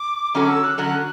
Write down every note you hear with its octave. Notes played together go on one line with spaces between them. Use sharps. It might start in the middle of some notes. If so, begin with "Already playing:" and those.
Already playing: D6
D3 F#3 C#4 F#4 A4 D6
E6
F#6
D3 F#3 C#4 F#4 A4 F#6